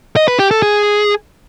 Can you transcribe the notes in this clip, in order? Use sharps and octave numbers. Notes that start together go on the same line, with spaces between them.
D#5
B4
G4
A4
G#4